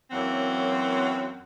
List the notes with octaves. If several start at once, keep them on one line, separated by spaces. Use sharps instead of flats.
F#2 E3 F#3 A#3 C4 F#5